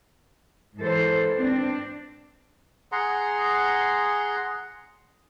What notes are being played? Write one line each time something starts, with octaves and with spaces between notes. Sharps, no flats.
G#2 E3 A4 C5
C4 D4
G#4 F#5 A#5 C6